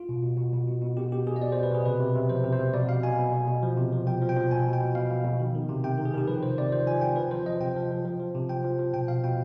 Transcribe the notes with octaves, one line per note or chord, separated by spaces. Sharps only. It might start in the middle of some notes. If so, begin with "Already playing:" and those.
Already playing: F4
B2
B2
B2
B2
B2
B2
B2 G4
B2 G4
B2 G#4
D#5
B2 D5
C5
B2
B4
B2 G#4
C3 B4
C3
C3
F3 C5
C3
C5
C3
B2 D5
B2 F5
B2 G#5
B2
B2
B2
F3
C3
F3
F3 G5
F3
G5
F3
B2 G#5
B2
G5
B2
B2 F5
B2
B2
D#3
D#3
C3
C3 G5
D#3
G#4
D#3 G4
F3 B4
C3 C5
C3 D5
F3 C5
F3 G#5
F3 G5
F3 B4
F3 C5
F3 D#5
C3 G5
F3
F3
F3
F3
C3
F3 G5
F3
F3
B2 G5
B2 F5
B2 G5